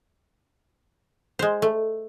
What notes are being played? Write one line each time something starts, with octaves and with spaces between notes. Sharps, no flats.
G#3 C5
A3